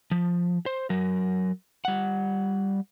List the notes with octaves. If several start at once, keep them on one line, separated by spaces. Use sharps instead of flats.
F3
C5
F#3 A#4
G3 F#5